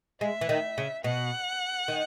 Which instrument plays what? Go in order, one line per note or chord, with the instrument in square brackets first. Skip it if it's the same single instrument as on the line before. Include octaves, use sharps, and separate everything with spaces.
[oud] G#3 [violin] E5
[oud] E3
D#3
C#3
[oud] B2 [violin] F#5
[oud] D#3